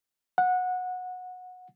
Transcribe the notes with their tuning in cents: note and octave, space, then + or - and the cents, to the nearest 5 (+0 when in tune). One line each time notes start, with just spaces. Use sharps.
F#5 -20